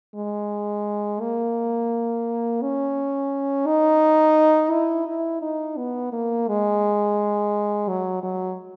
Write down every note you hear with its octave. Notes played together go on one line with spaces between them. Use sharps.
G#3
A#3
C#4
D#4
E4
E4
D#4
B3
A#3
G#3
F#3
F#3